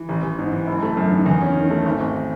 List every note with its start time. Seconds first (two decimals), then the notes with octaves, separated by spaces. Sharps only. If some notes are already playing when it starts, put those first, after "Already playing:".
Already playing: E3
0.09 A1
0.23 A1
0.39 G#2
0.53 E3
0.67 F#1
0.82 A3
0.97 F#2
1.11 D#3
1.26 E2
1.42 C#4
1.56 D#3
1.70 A3
1.85 G#1
2.00 G#1